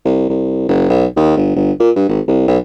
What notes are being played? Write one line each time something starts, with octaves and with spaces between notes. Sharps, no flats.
C2
C2
F#1
B1
D#2
G1
G1
A#2
G2
G#1
C2
B1